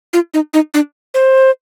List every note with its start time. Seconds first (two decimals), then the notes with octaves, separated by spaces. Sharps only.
0.13 F4
0.34 D#4
0.54 D#4
0.74 D4
1.14 C5